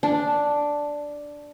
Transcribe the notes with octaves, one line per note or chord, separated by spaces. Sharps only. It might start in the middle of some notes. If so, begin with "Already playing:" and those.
D4